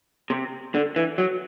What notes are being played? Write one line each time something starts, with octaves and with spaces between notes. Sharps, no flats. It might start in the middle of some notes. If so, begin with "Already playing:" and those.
C3
D3
E3
F#3